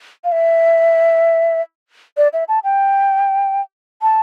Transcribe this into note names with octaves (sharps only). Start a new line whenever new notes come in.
F5
E5
D5
E5
A5
G5
A5